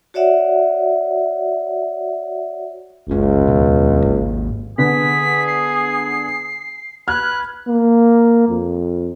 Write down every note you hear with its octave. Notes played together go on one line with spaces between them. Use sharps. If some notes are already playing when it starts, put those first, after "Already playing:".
F#4 C#5 D5 E5 F#5
F#1 C#2 C#4
D#2 B2
G#1 G#2 A#3
D3 B3 G#4 B6
C7
B4 F6 F#6 G#6
A#3
F2